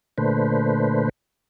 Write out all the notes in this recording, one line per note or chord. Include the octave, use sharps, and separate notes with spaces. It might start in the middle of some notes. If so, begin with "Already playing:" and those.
A#2 D3 A3 B4 C5